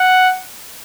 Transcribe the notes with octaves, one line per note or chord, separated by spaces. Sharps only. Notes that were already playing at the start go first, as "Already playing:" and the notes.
Already playing: F#5